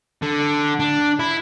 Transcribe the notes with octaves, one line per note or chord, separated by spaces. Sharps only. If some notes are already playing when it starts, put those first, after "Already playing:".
D3
D4
E4